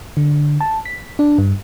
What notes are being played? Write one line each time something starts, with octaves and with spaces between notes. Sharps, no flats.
D3
A5
B6
D4
G2